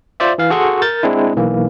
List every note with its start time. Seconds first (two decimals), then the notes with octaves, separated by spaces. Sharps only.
0.20 F4 C5 D5 E5
0.38 E3 F5
0.50 F#4 G#4 A4 F#5 C6 C#6
0.82 A#4 G6 A6
1.03 G#3 C4 D4 E4
1.36 B1 E3 A#3